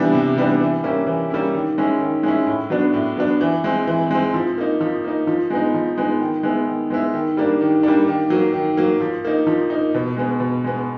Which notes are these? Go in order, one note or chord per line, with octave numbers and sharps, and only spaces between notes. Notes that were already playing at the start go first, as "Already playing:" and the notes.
Already playing: C3 E3 G3 B3 D4
C3
E3 G3 B3 D4
E3
G3 A#3 C#4 E4
E3
G3 A#3 C#4 E4
D#3
G#3 C#4 E4
D#3
G#3 C#4 E4
A2
F#3 B3 D4
A2
F#3 B3 D4
E3
G#3 C4
E3
G#3 C4
F3
A#3 D#4
F3
A#3 D#4
F3
G#3 B3 D#4
F3
G#3 B3 D#4
D#3
G#3 B3 E4
D#3
G#3 B3 E4
D#3
G3 A#3 D4
D#3
G3 A#3 D4
D#3
F#3 A#3
D#3
F#3 A#3
F3
A#3 D#4
F3
A#3 D#4
B2
G#3 B3
B2
G#3 B3